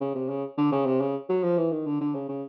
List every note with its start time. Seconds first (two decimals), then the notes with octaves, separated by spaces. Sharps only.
0.01 C#3
0.15 C3
0.29 C#3
0.58 D3
0.72 C#3
0.86 C3
1.01 C#3
1.29 F#3
1.44 F3
1.58 E3
1.72 D#3
1.86 D3
2.01 D3
2.15 C#3
2.29 C#3